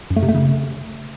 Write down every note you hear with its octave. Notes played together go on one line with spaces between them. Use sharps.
F#2
A3
C3
A3
C#3